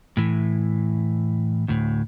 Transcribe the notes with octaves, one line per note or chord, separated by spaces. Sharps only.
A2 E3
D2 A2